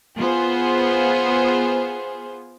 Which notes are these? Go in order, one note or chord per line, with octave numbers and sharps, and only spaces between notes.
B3 F4 G#4 C5